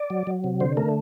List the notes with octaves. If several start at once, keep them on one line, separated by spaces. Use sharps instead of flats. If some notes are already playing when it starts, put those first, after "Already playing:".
Already playing: D5
F#3
F#3
C3
D3 C5
A3 A#4